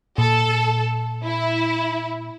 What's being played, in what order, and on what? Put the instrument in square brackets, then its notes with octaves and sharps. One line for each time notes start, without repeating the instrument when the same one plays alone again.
[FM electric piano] A#2 [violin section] A4
[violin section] E4